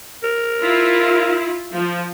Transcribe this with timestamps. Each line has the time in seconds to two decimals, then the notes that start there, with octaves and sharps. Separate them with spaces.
0.23 A#4
0.60 E4 F4
1.74 F3